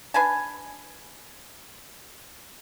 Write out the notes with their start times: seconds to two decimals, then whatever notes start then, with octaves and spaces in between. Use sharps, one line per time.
0.14 D4 B4 G#5 A5